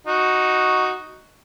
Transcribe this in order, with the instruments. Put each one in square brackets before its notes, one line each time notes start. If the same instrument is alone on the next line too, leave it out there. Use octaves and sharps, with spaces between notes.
[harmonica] D#4 F#4